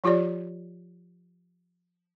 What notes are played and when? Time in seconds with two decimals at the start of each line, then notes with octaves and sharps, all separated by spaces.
0.04 F3 F4 G4 C#5 D5